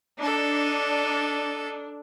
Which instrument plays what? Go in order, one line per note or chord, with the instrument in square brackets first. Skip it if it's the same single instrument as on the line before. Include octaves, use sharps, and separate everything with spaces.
[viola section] D4 [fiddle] D#4 A4